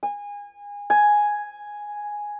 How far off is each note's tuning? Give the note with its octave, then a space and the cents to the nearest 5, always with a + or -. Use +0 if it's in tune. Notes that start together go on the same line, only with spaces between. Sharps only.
G#5 -25
G#5 +0